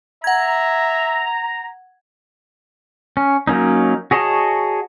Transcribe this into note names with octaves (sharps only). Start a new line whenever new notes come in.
E5 F#5 A#5 G#6
C#4
F#3 A#3 C#4 D#4
F#4 G#4 C#5 D#5 A5